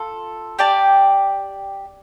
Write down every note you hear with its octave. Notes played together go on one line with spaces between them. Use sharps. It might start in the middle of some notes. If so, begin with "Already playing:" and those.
Already playing: F4 A4
G4 D5 A5